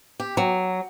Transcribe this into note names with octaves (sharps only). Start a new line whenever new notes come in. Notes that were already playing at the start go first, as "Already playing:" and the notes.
G4
F#3